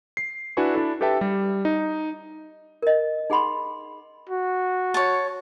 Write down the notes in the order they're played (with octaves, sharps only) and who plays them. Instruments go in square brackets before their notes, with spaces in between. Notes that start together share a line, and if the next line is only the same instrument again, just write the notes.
[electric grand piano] C7
D4 E4 F#4 B4 G#5 C#6
D4 E4 A4
G4 A4 B4 E5 G5 A5
G3
D#4
[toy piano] A#4 D#5
D#4 G#4 F#5 B5 C6
[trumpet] F#4
[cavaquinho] C#5 A5